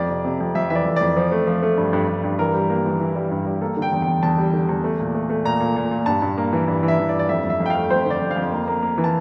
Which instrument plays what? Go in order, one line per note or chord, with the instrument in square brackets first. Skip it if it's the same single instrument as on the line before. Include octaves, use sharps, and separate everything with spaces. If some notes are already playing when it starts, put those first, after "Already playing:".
Already playing: [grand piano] F2 D5
C3
C3
F2
F2 E5
E3 E5
D5
F2
F2 D5
F3
A3
F3
A3
G2
G2
G2
G2
E3 A#4
G3
A#3
E3
E3
G3
G2
G3
A#3 A4
D3
G5
E2
G5
E2
E2 A5
G3
D3
E2
A3
A#2
A3
A3
A#2 A#5
A#2
A#2
A#2
G2 A5
G2
A#3
E3
G2
E3
E5
E3
D5
G2
D5
F2 E5
F2
E5
F2
G5
F5
A3
F2 C5
D3 D5
F2
F5
F2
A#3
A#3
A#3
E3
A5